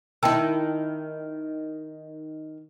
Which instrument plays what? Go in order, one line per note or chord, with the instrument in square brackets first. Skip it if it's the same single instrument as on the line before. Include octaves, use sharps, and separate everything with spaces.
[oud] D#3 E4 [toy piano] G5 A5 E6